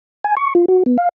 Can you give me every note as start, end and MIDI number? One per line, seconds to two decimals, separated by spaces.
0.24 0.35 80
0.37 0.54 85
0.55 0.65 65
0.68 0.83 66
0.86 0.97 59
0.98 1.09 77